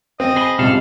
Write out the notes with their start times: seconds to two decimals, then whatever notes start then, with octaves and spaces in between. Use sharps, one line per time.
0.20 C4 D#5
0.36 G#4 B4 G7
0.59 C#2 G#2 C3 G3 D4 A4 F5